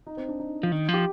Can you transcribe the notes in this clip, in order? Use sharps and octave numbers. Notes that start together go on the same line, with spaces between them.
D#4
C4
D4
D#4
F3
D#3
F3 G4